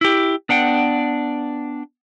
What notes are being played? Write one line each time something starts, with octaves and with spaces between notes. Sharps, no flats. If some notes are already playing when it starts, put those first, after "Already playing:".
E4 G4
B3 D4 F#5 G5